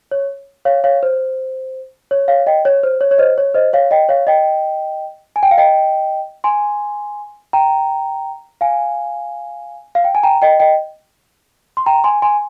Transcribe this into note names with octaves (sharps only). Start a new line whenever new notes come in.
C#5
C#5 F5
C#5 F5
C5
C#5
C#5 F5
D#5 G5
C#5
C5
C#5
C#5
C5 D#5
C#5
C5 D#5
C#5 F5
D#5 G5
C#5 F5
D#5 G5
G#5
G5
F5
D#5 G5
G#5 C6
G5 A#5
F5 G#5
F5
G5
G#5
G5 A#5
D#5 G5
D#5 G5
C6
G5 A#5
G#5 C6
G#5 C6